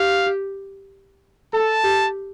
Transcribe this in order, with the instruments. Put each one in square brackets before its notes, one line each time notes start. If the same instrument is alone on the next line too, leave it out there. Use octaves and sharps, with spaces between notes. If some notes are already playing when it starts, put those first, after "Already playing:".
Already playing: [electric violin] G4 [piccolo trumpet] F5
[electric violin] A4 [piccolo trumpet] A5
[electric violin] G4